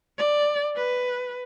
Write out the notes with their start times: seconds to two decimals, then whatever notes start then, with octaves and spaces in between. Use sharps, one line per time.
0.18 D5
0.76 B4